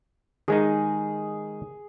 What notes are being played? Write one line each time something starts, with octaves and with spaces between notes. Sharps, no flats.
D#3 G#3 D#4 G#4